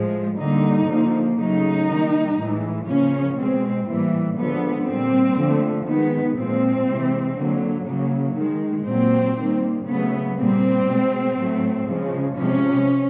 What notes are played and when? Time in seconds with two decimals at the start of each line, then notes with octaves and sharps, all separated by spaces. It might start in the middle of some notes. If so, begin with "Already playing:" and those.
Already playing: A2 F3 G#3
0.38 D3 G3 A#3 D#4
0.87 D3 F3 A#3
1.38 C#3 F#3 A3 D#4
1.88 D#3 G3 A#3
2.37 A2 E3 G#3
2.87 C#3 F3 A#3 C#4
3.37 B2 G#3 C4
3.87 A2 E3 G3 A#3
4.37 D3 F3 G#3 B3
4.86 A#2 G3 A#3 C4
5.37 D3 F3 A3
5.86 D#3 G#3 B3
6.37 A#2 F3 G#3 C4
6.87 C3 E3 G#3
7.36 D3 F#3 A#3
7.87 C#3 F#3 A#3
8.36 D#3 G#3
8.86 A#2 F#3 A#3 C4
9.36 D#3 G3 A#3
9.86 C#3 F#3 A3 B3
10.35 A#2 G3 A#3 C4
10.86 B2 G#3
11.36 A2 F#3 A3
11.86 C#3 F3 G#3
12.36 C3 F3 G#3 C#4